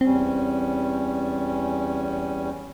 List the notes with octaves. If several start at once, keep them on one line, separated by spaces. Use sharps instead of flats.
E2 G3 C4 C#4